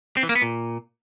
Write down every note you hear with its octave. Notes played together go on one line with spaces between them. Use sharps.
C4
E3
A#3
B3
A#2